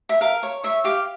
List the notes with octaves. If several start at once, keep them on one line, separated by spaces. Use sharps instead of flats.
E5
A#4 F5
C#5
C#5 E5
G4 F5